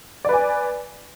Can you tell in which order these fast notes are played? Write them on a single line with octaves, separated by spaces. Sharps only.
D5 B4 G#5